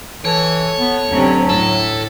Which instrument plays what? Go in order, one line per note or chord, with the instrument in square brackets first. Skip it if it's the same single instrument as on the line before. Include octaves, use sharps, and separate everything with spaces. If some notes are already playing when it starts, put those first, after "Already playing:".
[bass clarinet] E3 [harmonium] A4 [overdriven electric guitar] C#5
[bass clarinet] B3
[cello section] D2 C3 C#4 [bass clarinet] F#3
[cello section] A2 [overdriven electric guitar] A4